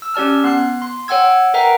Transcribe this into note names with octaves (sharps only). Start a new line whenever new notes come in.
E6
C#4 G4 D5 A5 F6
B3 F#6 C7
C6
C#5 F#5 G5 E6 G#6
A#4 B4 E5 F#5 G5 A#5